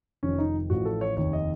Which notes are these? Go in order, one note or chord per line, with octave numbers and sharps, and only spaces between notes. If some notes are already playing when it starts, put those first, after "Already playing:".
F1 F2 D#3 C#4
D#4
A1 A2 F3 F#4
A4
C#5
F1 D#2 D#3 C#5
D#5